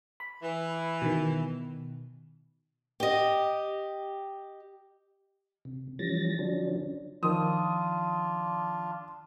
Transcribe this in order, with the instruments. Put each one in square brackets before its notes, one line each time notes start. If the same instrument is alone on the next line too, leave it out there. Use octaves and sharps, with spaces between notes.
[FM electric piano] B5
[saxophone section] E3
[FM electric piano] B2 D#3
[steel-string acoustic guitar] G4 D#5
[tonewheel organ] C3
E3 F3 G3 C#4 A6 A#6
D3 F3 F#3 C#4 D4
[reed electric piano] D#3 F3 [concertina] D4 F4 [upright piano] D#6